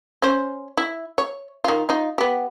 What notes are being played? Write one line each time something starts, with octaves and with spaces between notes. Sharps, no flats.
C#4 C5
E4
C#5
D#3 F4
D#4 F4
B3 G4